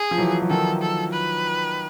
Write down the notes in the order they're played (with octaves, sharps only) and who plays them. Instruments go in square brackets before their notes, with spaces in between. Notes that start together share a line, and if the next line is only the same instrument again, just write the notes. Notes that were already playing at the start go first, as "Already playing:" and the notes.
Already playing: [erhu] G#4
[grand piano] F3
E3 F#3
F#3
[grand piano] D#3 F3 [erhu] A4
[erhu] A4
B4